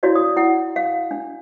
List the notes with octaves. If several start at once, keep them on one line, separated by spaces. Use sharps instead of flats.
E4 F#4 C#5 D5 F5
D5 D#6
E4 F#5
F5
D4